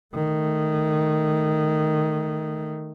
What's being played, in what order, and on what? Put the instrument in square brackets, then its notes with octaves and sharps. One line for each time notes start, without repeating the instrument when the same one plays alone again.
[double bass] D#3 A3